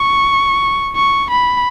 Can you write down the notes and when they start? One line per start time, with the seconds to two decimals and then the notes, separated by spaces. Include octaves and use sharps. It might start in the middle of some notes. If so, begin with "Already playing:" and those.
Already playing: C#6
0.96 C#6
1.30 B5